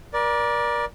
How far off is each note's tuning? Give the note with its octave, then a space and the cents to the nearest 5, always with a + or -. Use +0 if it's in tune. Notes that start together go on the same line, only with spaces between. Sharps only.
A#4 +35 D5 +0